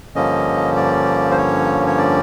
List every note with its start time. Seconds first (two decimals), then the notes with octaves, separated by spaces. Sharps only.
0.15 G2 D3 F3 A#3 C#4 D#5
0.76 D5
1.31 C5
1.38 C#5
1.87 C#5
1.98 D5